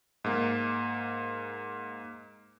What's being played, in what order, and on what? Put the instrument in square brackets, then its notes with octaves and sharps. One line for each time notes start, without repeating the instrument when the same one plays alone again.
[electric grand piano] G#2 A#3